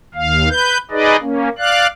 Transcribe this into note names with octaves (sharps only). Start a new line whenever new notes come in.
D#2 F5
B4 G6
D#4 G#4 B4 D5 D#5
A#3 C#4
D5 F5 F#6